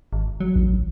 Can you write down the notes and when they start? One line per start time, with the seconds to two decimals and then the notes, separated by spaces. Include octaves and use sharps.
0.13 G#1
0.40 F#3
0.56 A1